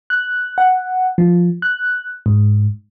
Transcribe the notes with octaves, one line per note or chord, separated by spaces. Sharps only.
F#6
F#5
F3
F#6
G#2